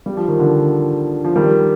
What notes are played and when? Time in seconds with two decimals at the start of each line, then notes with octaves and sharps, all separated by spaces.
0.06 G3
0.17 F3
0.28 D#3
0.39 D3 F3
1.24 F3
1.36 D#3 G3